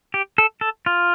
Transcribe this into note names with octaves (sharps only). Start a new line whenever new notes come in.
G4
A4
A4
F4